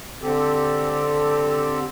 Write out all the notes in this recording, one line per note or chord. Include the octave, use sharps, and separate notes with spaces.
D3 C4 G4 A4